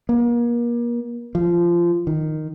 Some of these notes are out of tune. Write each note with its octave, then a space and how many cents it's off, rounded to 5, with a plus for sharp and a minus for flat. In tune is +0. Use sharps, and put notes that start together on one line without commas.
A#3 +35
F3 -20
D#3 -5